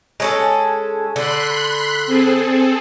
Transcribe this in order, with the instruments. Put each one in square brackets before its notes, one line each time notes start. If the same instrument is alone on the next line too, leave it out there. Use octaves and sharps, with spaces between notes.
[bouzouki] G#3 C#4 A4
[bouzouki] D3 [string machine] B5 C6 F#6
[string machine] C4 G#4 A4